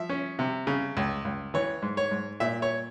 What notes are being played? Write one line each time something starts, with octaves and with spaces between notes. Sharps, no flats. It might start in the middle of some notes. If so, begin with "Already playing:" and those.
Already playing: F3 E5
C#4
C3
C#3
C#2
C#2
E3 C#5
G#2
C#5
G#2
A#2 E5
C#5